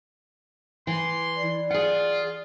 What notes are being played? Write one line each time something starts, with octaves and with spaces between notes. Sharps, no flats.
E3 C6
D5
F4 G#4 F#5